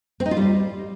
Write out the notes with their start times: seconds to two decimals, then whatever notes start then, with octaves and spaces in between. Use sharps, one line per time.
0.20 C4
0.26 D#4
0.31 F4
0.37 G3